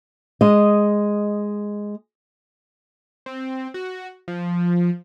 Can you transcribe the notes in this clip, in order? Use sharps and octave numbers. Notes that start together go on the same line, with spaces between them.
G#3 D#5
C4
F#4
F3